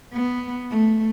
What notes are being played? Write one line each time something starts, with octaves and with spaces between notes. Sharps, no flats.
B3
A3